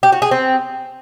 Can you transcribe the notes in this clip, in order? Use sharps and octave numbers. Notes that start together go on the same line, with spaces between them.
G4
F#4
G#4
C4